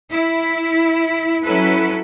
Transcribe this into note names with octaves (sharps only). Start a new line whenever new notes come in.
E4
F#3 C#4 E4 A4 B4